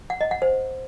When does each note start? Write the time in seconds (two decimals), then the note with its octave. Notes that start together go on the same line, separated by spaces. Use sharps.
0.10 F#5
0.21 D#5
0.31 F#5
0.42 C5